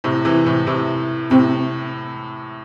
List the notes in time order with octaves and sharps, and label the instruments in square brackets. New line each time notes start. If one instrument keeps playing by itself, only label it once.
[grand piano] A2 C3
C3 E3
A2 C3
A2 C3
[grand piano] A2 C3 [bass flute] C4